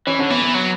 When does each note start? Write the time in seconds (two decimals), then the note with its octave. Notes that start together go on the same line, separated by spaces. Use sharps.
0.07 E3 C#4
0.19 D3 C#4
0.30 E3 B3
0.42 B3
0.54 F#3